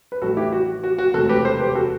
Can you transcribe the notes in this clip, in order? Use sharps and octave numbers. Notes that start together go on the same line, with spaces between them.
B4
A1 A2 G3 B3 F#4 A4
E4 G4
F#4
F#4
F#4
E1 D2 C3 F#4 A4
G4 B4
A4 C5
G4 B4
F#4 A4